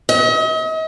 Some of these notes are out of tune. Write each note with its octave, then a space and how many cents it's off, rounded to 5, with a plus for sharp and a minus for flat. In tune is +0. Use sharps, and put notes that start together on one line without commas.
D#5 +40